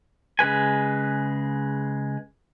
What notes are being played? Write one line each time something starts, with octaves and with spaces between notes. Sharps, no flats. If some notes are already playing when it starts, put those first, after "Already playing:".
C#3 G#3 B4 G#5